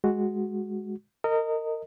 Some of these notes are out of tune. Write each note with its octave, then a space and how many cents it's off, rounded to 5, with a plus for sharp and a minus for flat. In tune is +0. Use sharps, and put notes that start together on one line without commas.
G#3 +0 F#4 +0
A#4 -30 D#5 +0